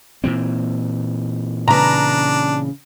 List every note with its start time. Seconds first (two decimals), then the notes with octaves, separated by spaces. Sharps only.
0.24 A#2 E3 C4
1.68 C#3 D4 B4 A#5